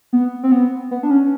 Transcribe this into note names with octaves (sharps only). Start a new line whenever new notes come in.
B3
C4
B3
B3
D4
C#4